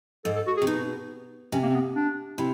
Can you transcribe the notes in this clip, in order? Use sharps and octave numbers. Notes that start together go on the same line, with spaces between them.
G#2 A4
A4
F#4
G#4
C3
B2 D#4
C3 C#4
A#3
C4
B3
D4
C3 E4